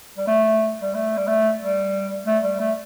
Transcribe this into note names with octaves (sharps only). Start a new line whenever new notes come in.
G3
A3
G3
A3
G3
A3
G3
A3
G3
A3